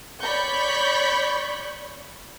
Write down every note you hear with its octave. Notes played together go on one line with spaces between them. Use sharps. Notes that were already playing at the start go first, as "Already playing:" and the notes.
C#5 D5 B5 C#6 G6